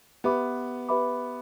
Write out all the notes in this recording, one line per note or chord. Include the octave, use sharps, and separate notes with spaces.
B3 G4 B4 E5 B5 D6
G4 B4 E5 B5 D6